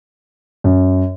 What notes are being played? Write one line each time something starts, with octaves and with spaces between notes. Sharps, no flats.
F#2